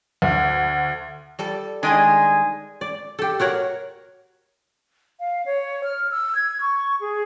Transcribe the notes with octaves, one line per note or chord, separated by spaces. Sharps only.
D2
G3 A4 A5
D#3 G#3 D4 G#4 G#5
D5
G4 A4
F#4 A#4 C#5 F#5
F5
C#5
F6
E6
G#6
C#6
G#4